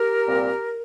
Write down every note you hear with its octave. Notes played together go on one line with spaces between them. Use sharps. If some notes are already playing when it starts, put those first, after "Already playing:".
Already playing: G4 A#4
C2 A#2 G3 C4